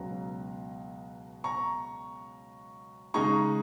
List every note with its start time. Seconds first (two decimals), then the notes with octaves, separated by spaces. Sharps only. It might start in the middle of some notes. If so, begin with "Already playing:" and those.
Already playing: C#2 B2 F#3 B3 A#5
1.44 A#5 C#6
3.14 C#3 G#3 D#4 A#5 C#6